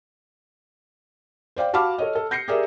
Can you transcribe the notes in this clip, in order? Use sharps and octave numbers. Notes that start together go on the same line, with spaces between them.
C5 D5 F5 G5
F#4 F5 A5 B5 D6 F6
A4 C#5 D#5
A4
G6 A#6 C7 C#7
G4 G#4 A#4 D5 E5